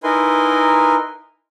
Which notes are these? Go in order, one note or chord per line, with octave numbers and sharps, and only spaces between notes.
D#4 E4 A#4 B4 G#5 C6